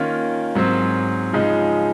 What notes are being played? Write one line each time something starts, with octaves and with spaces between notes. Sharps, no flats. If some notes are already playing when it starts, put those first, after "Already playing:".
Already playing: D#3 A#3 C#4 F4
G#2 F#3 C4
C#3 F3 G#3 D#4